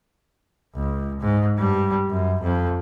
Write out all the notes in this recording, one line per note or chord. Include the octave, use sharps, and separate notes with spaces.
C#2
G#2
G2 G3
F#2
F2